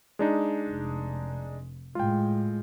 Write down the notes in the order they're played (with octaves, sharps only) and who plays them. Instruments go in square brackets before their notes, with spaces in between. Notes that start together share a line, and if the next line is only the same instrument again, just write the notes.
[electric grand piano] G#3 D4 D#4
[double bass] F1
[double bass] A2 G#3 [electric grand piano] F4 G5